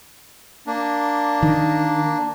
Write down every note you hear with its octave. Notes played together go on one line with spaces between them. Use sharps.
A#3 D4
D#3